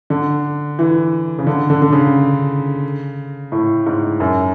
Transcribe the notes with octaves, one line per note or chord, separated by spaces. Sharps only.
D3
E3
C#3
D3
D3
D3
C#3
A2
G#2
F#2